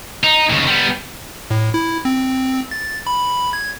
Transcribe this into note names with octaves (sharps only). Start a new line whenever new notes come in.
D#4
D#2 C#3
G3 B3
A2
E4
C4
A6
B5
G#6